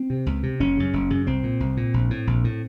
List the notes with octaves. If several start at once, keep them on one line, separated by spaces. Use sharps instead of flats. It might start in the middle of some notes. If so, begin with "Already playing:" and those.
Already playing: C4
C3
C#2
C3
F#1 C#4
F#2 C#3
F#1
F#2 C#3
C2 C4
A#2
C2
A#2
A#1
A2
A#1
A2